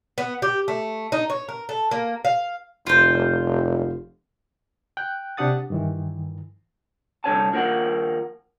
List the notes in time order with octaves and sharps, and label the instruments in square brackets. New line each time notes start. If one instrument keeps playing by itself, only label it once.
[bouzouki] B3
G4
A3
D#4
C#5
A#4
A4
A#3
F5
[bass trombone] F1 [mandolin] F4 C5
[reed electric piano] G5 F#6
C3 D4 G4 F#5 D#6 A6
G2 D#3 E3
[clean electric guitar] C2 F2 D3 C#5 G#5 A5
D#2 F3 A#3 A#4 F#5